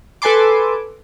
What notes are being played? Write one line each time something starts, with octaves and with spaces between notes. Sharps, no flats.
A4 B4 G#5 A5 C6 D6